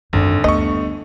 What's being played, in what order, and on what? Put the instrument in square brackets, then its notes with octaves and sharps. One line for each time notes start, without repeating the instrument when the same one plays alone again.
[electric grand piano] G#1 [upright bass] F#2 C4 [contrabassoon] D3
[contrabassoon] G1 [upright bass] D2 [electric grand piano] A3 C#6 [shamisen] D#5